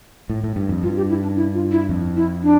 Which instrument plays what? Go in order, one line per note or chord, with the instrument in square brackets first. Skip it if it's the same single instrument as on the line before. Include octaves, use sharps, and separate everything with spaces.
[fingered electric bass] A2
A2
G2
F2
[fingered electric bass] G2 [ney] F4
[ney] G4
E4
D4
E4
F4
E4
[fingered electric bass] F2
[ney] E4
D4